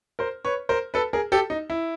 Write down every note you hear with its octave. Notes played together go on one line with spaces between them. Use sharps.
A#4 C5
B4 C#5
A#4 C5
A4 B4
G#4 A#4
G4 A4
D#4
E4